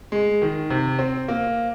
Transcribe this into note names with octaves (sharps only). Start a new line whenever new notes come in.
G#3
D#3
C3
C4
A#3